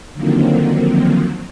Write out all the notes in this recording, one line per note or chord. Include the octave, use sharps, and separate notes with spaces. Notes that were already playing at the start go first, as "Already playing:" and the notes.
D3 D#3 F3 F#3 A#3 C4